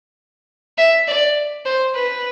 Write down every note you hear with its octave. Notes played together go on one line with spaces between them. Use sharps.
E5
D5
C5
B4